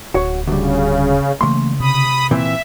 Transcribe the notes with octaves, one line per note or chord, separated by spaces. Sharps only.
D1 F#4 C#5
D2 C#3 G3
C#3 E3 A3 A#3 C6
C3 B5 D#6
A#2 E3 C4 E5